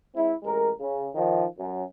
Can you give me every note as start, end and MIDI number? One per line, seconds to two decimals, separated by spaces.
0.15 0.32 56
0.15 0.32 60
0.15 0.32 64
0.43 0.70 33
0.43 0.70 56
0.43 0.70 70
0.79 1.07 49
1.15 1.44 51
1.15 1.44 53
1.58 1.82 42